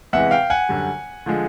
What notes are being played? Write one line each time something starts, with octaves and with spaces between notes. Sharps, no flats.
E2 C3 E3 G#3 E5 F#5
F5 G5
F#5 G#5
F#2 D3 G3
D3 F3 G#3